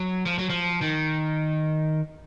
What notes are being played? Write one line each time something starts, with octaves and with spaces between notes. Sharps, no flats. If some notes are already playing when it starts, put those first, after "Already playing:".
Already playing: F#3
F3
F#3
F3
D#3